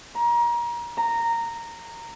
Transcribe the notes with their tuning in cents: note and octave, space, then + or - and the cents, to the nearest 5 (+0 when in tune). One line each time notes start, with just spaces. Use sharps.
A#5 +30
A#5 -10